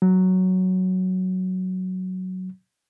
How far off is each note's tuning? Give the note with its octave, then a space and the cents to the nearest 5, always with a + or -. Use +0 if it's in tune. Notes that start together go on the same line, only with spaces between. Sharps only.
F#3 +5